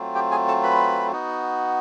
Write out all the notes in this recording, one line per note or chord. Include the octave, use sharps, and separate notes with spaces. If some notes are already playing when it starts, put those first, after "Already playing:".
Already playing: F#3 A3 C4 F4
G4 G5
G#4 G#5
A4 A5
B4 B5
B3 D#4 F#4